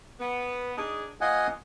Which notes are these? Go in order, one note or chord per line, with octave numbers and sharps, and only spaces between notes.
B3
D4 D#4 G#4
A#3 F4 D#5 F#5 G#5